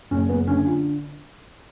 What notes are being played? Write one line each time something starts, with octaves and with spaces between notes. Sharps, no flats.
F#1 C#4
B3
D3 C#4
F4